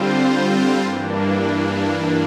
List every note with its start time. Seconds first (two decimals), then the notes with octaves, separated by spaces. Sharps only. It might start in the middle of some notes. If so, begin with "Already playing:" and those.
Already playing: D3 G3 C4 F4 C5
0.82 G2 E3 A#3 D4